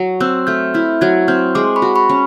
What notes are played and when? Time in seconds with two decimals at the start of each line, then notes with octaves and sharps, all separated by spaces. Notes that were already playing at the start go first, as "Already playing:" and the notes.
Already playing: F#3
0.20 C4 E6 F#6
0.47 A3 F6 G6
0.74 E4 F6 G6
1.01 F#3 F#6 G#6
1.28 C4 F6 G6
1.55 G#3 C6 D6
1.76 B5 C#6
1.82 F#4
1.96 B5 C#6
2.10 C#4